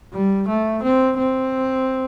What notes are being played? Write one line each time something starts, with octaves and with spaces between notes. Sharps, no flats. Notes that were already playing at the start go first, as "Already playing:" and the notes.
G3
A3
C4
C4